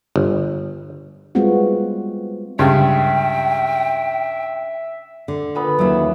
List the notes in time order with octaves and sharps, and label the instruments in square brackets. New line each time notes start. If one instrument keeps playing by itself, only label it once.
[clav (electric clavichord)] G1
[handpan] G3 G#3 B3 C4 F4 F#4
[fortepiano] C#2 G2 C#3 [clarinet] E5 [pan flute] G5
[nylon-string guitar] D3
[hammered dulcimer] A#2 B3 B5
[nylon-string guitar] D#2 F#3 [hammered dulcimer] C#3 E5